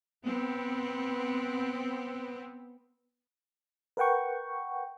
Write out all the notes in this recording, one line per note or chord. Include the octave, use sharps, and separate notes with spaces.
B3 C4
A#4 B4 F#5 G5 C#6